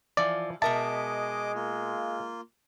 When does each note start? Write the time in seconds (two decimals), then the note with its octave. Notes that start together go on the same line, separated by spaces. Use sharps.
0.17 E3 F3 F4 D5
0.62 B2 G#3 A#4 D#5 E5 A5 D6
1.55 A#3 F4